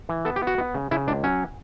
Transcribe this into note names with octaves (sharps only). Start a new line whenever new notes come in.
E3
B3 A4
G4
B3 F#4
B3
C#3
C#3 E4
C#2 D4
F#3 C#4